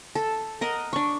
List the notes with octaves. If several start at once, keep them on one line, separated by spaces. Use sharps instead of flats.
A4
A#4 D#5 F#5
D4 C#6